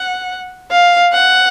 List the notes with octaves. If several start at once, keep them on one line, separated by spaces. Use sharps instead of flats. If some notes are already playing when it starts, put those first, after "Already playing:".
Already playing: F#5
F5
F#5